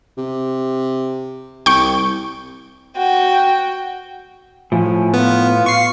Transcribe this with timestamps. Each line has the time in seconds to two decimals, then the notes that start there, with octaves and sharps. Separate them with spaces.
0.18 C3
1.66 C2 G5 C#6
2.97 F#4 G5
4.72 A2 F3 G#5
5.14 B3 F4
5.66 C#6 C7